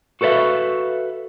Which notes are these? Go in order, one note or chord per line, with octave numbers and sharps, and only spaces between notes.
F#4 A4 B4 D5 E5 F5